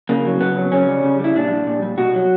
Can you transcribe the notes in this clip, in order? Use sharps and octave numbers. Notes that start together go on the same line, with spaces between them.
C#3 A#3
F#3
C#3 B3
F#3
C#3 C#4
G3
C#3
G3 E4
A#2 D4
G3
A#2
G3
B2 F#4
F#3